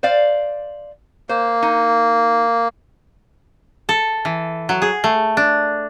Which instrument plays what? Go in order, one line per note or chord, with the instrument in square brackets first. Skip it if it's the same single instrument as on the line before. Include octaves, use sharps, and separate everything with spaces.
[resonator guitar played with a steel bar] C5 D5 F5
[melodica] A#3 [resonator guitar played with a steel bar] C5
[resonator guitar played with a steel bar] D#4
[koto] A4
E3
F#3
G#4
A3
D4